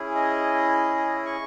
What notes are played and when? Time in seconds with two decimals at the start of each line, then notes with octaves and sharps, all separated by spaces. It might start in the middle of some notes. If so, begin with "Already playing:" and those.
Already playing: C#4 E4 G#4
0.15 D#5
1.25 C#6